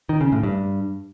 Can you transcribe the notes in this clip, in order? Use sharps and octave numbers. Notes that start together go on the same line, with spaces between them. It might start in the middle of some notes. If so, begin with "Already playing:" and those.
D#3
C#3
A2
G2